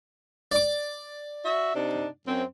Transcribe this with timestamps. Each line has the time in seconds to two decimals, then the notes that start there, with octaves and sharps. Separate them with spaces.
0.52 D5 D6
1.44 F#4 E5
1.74 C3 D4 D#4
2.26 F#2 C4